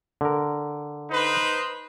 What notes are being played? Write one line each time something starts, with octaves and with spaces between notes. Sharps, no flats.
D3 A#4
D#4 B4 C5